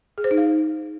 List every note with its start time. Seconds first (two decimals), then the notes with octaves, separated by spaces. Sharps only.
0.18 G#4
0.24 C5
0.31 D#4
0.38 F5